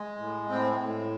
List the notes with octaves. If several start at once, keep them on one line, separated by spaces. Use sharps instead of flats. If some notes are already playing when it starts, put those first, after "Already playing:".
Already playing: G#3
A2
A2 C4
A2